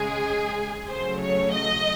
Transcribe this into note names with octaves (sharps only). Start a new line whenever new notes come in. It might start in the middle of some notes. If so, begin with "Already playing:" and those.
Already playing: C#3 G#3 G#4
C#3 F#3 A3 C5
C#5
D#5